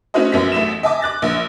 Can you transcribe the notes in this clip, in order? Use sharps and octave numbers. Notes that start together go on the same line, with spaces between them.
A3 C#4 E4 F#4 C5 D#5
A#1 F#2 B3 B6
A1 A3 E5 B6 E7
D#5 E5 G#5 A5 D6
D6 F#6 A6 A#6
A#1